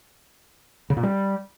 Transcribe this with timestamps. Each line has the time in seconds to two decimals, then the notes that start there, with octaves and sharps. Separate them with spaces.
0.90 C#3
0.97 A#2
1.03 G3